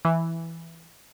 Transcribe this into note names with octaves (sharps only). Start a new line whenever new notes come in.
E3